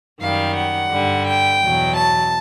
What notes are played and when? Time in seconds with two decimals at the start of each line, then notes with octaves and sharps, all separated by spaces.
0.20 F#2 D#3 G3 F5
0.55 F#5
0.91 G2 D3 G3
1.27 G5
1.61 E2 B2 F#3
1.97 A5